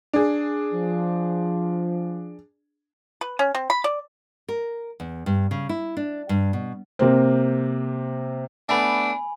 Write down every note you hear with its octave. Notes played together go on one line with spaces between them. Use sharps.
D4 G#4
F3
B4
C#4
C4
B5
D5
A#4
E2
G2
C#3
E4
D4
G2
B2
C3 A#3 C4
A3 B3 D4 G#5 B5